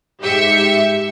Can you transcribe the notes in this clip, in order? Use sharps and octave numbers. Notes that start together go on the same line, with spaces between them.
G#2 G4 E5 C#7